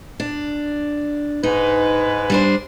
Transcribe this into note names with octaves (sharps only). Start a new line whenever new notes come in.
D4
G#2 D#4 B4
G3 D4 C5